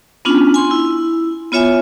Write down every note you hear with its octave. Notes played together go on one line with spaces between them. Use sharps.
B3 C#4 D4 F4
G#5 C6
E4
B3 F4 C#5 E5 G#5